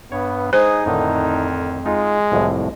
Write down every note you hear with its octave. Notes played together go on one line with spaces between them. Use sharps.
G2 B3 C#5
G#3 D#4 G#4 C5
F2 A2 D3 D#3
G#3 D#4 F4
C2 F2 A2